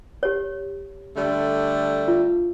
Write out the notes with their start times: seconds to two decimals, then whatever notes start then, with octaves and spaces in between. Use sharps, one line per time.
0.23 G4 C#5
1.17 D3 G3 A3
2.08 F4